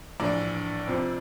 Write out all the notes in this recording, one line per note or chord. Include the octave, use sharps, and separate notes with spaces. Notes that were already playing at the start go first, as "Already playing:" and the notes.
A#1 A2 E3 D4 D5
F2 C3 F3 C4